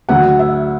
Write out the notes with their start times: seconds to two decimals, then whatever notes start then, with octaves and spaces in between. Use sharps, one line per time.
0.09 D2 D3 F#3 F#5
0.39 E5